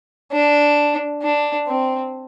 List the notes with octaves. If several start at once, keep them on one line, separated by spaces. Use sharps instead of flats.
D4
D4
C4